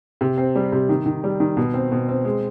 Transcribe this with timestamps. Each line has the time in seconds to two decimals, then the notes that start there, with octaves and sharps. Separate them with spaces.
0.21 C3
0.38 C4
0.56 G3
0.72 C3
0.89 D#3
1.06 D#3
1.24 G3
1.40 D#3
1.57 B2
1.74 C4
1.92 B2
2.09 C4
2.25 G#3